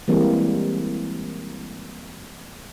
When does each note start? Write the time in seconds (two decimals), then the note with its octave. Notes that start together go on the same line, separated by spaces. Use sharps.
0.08 E3 G3 G#3 A#3 C4